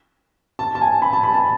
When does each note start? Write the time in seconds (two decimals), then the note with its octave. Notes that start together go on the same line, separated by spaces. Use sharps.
0.59 A5
0.75 A5
0.81 G#5
1.02 B5
1.13 A5
1.23 B5
1.34 A5